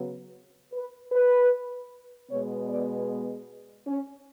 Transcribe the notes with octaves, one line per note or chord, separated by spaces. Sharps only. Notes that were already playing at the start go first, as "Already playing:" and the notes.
Already playing: C#3 F#3 B3
B4
B4
B2 G#3 B3 C#5
D5
C#4